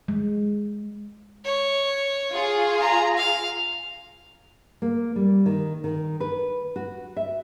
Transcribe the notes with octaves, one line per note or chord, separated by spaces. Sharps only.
G#3
C#5
F4 G#4
A#5
F5
A#3
G3
D#3
D#3
B4
F#4
E5